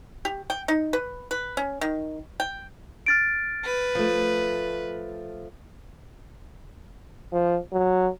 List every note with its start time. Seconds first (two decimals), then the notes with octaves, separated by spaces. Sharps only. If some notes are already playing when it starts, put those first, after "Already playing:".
0.25 G4
0.50 G5
0.68 D#4
0.93 B4
1.31 B4
1.57 C#4
1.81 D#3
2.40 G5
3.06 F6 A6 D7
3.65 B4
3.95 F3 A3
7.33 F3
7.72 F#3